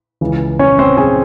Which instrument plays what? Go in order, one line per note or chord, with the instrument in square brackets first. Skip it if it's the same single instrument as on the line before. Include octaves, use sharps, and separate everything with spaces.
[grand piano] C#2 C#3 E3
C#4 C#5
C4 C5
G#4 G#5